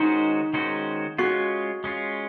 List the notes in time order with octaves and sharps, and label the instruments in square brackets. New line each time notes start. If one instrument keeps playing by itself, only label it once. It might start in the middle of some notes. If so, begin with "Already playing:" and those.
Already playing: [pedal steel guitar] D#3 G#3 C#4 F#4 C5 [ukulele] D#4
[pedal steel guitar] D#3 G#3 C#4 F#4 C5
[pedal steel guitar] G#3 C#4 F4 [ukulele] F#4
[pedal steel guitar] G#3 C#4 F4